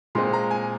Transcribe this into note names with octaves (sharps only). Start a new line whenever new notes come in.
A#2 G#3 C4 C6
A#5
G#5